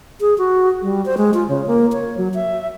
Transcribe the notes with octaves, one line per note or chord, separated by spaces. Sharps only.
G#4
F#4
G3
C5
G#3
F4
C#3
A#3
C#5
F#3
E5